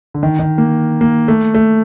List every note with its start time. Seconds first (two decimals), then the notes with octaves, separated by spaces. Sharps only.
0.14 D3
0.23 D#3
0.39 D#3
0.58 A#3
1.01 A#3
1.28 A3
1.54 A3